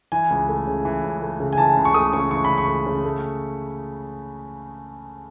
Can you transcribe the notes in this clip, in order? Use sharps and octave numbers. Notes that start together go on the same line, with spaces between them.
E3 G#5
C#2
A3
C#3
E3
C#2
A3
C#3
G#5
E3 A5
C#2
C#6
A3 D#6
C#3 C#6
E3 C#6
C#2 B5
C#6
A3
C#3
A3